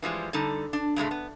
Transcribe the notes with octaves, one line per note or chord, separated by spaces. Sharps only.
E3 F3 G3 G#3
D3 G3 D#4 A4
D4
G2 C3 G#3 A3
B3